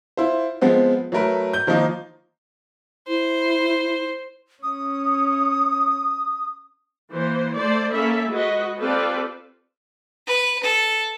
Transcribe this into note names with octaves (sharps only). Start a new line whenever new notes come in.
E4 F4 C5
F3 G#3 B3 C4
F#3 A3 A#4 B4
G6 G7
D#3 F3 A#3 D#4
E4 C5
C#4 D#6
E3 A#3 C5
A3 C5 D5
A#3 C#4 A4 E5 B5
G#3 F#4 B4 D#5
C4 F4 G4 A4 B4 D5
B4
A4